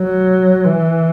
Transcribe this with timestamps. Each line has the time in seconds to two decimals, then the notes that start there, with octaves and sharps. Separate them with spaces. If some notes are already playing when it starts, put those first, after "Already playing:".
Already playing: F#3
0.64 E3